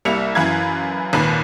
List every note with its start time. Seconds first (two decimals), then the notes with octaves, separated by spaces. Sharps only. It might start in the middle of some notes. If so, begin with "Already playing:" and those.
0.05 C2 G3 A#3 E5 C#7 F7
0.35 F#2 E3 B4 F5 G#6
1.13 G#1 D#2 A#2 B4